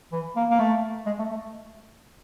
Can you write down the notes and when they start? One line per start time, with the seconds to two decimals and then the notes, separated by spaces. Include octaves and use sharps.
0.12 E3
0.36 A#3
0.50 A#3
0.59 A3
1.06 G#3
1.19 A3
1.31 A3